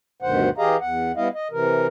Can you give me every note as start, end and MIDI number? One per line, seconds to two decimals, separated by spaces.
0.22 0.49 38
0.22 0.49 43
0.22 0.49 47
0.22 0.49 51
0.22 0.49 72
0.22 0.49 78
0.58 0.77 52
0.58 0.77 67
0.58 0.77 68
0.58 0.77 75
0.58 0.77 77
0.58 0.77 82
0.80 1.12 40
0.80 1.12 78
1.16 1.28 55
1.16 1.28 59
1.16 1.28 64
1.16 1.28 75
1.16 1.28 77
1.34 1.48 75
1.51 1.87 48
1.51 1.87 52
1.51 1.87 70